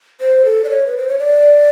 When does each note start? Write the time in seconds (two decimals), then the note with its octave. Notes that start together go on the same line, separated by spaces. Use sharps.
0.21 C5
0.45 A4
0.64 D5
0.69 C#5
0.87 B4
0.97 C5
1.08 C#5
1.19 D5